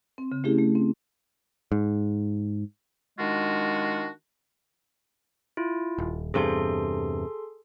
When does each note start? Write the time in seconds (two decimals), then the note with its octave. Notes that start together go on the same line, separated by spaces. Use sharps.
0.18 C4
0.32 C#3
0.44 A3 C#4 E4 G4 G#4
0.58 A3
0.75 C4
1.72 G#2
3.19 D#3 G#3 D4 F4 F#4
5.57 E4 F4
5.98 D#1
6.34 E2 G2 C3 G#4 A4 C6